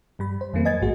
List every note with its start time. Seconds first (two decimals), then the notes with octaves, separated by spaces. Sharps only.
0.19 G2 G3 B5
0.41 C5
0.53 F2 D#3 F#3 A3 A#3 C4
0.65 B4 D#5 G#5 G#6 A6
0.81 A1 G#2 A3 F#4 G#4